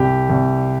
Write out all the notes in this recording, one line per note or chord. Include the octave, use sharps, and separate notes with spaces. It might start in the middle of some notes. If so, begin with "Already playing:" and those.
Already playing: C2 G4
C2